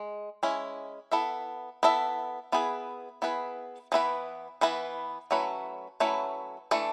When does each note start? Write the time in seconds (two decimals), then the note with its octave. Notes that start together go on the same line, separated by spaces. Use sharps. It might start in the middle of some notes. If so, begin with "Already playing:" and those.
Already playing: G#3
0.43 G#3 C#4 E4
1.11 B3 E4 A4 E5
1.83 B3 E4 A4 E5
2.52 B3 E4 G#4 B4
3.22 B3 E4 G#4 B4
3.92 E3 B3 E4 B4
4.61 E3 B3 E4 B4
5.31 F#3 A3 C#4 E4 B4
6.00 F#3 A3 C#4 E4 B4
6.71 E3 A3 D4 A4